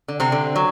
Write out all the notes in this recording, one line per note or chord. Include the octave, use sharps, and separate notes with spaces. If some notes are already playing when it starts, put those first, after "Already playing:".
D3
C3 C4
D3
F#3